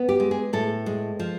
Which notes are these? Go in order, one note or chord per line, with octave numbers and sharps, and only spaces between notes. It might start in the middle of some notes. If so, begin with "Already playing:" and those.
Already playing: B3
G4
G#3
G#4
A2 A4
G#3
F3